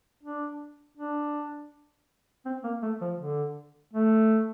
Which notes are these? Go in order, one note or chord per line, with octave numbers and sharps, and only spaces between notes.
D4
D4
C4
A#3
A3
F3
D3
A3